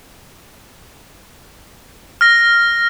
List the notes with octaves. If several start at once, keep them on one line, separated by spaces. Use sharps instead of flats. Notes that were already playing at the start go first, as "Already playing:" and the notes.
F6 A#6